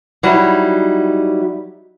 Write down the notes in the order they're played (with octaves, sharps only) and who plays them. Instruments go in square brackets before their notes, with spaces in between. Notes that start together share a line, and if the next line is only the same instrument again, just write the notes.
[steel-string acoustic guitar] F#3 G3 D#4 E4